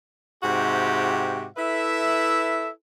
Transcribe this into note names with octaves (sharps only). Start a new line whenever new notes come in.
G#2 C3 F#4 G4
E4 A4 B4 E5